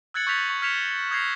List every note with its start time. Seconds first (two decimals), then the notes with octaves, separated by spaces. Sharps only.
0.14 E6 F#6 G#6 A6 C#7 F#7
0.27 C#6 E6 G6 A6 B6 F7
0.50 C#6
0.62 F6 G#6 B6 C#7 E7 F7
1.11 D#6 G6 G#6 A#6 C7